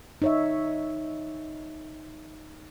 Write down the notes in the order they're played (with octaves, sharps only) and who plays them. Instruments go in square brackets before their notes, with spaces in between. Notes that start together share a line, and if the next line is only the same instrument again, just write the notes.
[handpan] D#4 C#5 E5